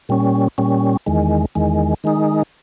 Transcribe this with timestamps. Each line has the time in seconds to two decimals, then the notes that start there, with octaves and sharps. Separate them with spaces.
0.09 A#2 G3 C#4
0.58 A#2 G3 C#4
1.06 E2 D#3 G#3
1.55 E2 D#3 G#3
2.04 D#3 G#3 D#4